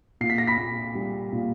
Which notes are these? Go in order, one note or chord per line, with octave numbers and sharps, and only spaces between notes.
A#2 C7
B6
A#6
B5 B6
A#2
G3
A#2